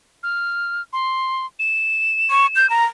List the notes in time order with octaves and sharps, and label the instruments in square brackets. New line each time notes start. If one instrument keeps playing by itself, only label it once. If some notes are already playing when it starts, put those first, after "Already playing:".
[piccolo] F6
C6
E7
[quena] C#6
G6
A#5